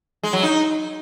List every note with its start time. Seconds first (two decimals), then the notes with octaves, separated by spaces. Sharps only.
0.23 G#3
0.33 F#3
0.43 D#4